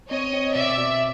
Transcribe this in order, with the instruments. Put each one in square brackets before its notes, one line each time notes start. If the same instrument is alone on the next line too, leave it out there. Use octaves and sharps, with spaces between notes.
[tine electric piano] C4 [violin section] C#5 D#5
[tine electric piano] C4
[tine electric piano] B2 [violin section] D5 E5
[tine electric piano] B2